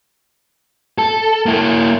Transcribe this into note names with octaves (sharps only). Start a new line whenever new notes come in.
A4
A#3 E4